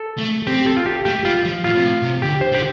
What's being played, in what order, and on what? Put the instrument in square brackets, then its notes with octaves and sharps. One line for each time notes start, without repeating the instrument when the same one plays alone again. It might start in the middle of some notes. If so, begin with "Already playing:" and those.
Already playing: [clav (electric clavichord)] A4
[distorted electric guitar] A3
[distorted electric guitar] C4 [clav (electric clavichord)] G4
[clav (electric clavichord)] A4
F4
G4
[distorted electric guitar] A3 [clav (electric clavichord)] G4
[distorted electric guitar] G3 [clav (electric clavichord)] F4
[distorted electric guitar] F3
[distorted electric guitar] A2 [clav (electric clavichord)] F4
[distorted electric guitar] C3
A2
C3
[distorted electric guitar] D3 [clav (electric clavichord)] G4
[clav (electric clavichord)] C5
[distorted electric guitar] D3 [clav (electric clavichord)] G4